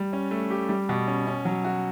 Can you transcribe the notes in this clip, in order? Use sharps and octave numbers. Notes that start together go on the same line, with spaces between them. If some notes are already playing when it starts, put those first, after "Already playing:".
Already playing: G3
C#4
A3
G4
G3
B2
C#4
C#4
F#3
F#4